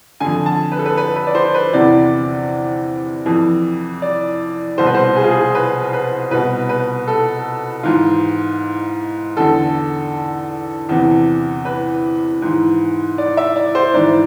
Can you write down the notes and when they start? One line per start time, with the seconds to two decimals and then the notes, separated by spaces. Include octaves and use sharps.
0.20 F2 D3 G#5
0.46 A5
0.72 B4
0.79 A4
0.86 B4
0.97 B4
1.16 B4
1.27 D5
1.35 C5
1.54 B4
1.73 E2 C3 E3 D5
3.26 F2 E3
4.02 D5
4.78 C2 B2 C5
4.86 B4
4.95 C5
5.16 G#4
5.23 F4
5.31 G#4
5.55 B4
5.93 B4
6.31 C2 B2 B4
6.69 B4
7.08 A4
7.83 G#2 E3 F4
9.37 E2 D3 A4
10.89 E2 C3 E3
11.65 B4
12.42 G#2 E3
13.18 D5
13.37 E5
13.56 D5
13.75 C5
13.94 G#2 E3 D5